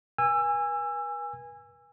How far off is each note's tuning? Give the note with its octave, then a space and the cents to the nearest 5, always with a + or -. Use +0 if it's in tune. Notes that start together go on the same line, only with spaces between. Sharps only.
B4 -40 G#5 -20 E6 +20